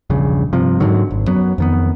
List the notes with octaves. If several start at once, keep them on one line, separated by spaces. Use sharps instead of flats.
E1 A#1 G2 C#3
G2 C3 F3
G#2 D3 D#3 F#3
G#1
F#2 F#3 B3
F2 D#3 B3